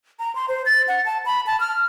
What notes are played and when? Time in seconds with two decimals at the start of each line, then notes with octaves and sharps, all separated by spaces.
0.19 A#5
0.35 C6
0.48 C5
0.66 A6
0.88 F#5
1.06 A5
1.26 B5
1.47 A5
1.60 F6